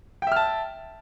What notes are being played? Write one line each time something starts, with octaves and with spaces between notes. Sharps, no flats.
E5 G5 A5 F6